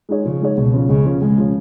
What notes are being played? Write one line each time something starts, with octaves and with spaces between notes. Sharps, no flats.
G#3 D#4 G#4 C#5
C#3 F3
G#3 D#4 G#4 C#5
C#2 B2
C#3 F3
C#2 C#3
C#3 F3
C#2 G#3
C#3 F3